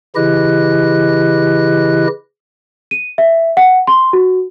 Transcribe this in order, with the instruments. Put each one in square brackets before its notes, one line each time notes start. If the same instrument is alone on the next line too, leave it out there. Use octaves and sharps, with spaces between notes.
[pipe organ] C#3 E3 E4 G4 D#5 F#6
[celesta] D#7
E5
F#5
C6
F#4